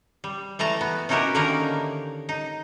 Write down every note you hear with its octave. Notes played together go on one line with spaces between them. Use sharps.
G3
E3 A3 A5 A#5
B3
C#4 D#4 E4 F#4 G4 A#4
D3 D#3 A#3 C#4 D#4 A#4
D#4